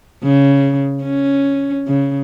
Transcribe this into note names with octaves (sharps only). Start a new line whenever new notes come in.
C#3
C#4
C#3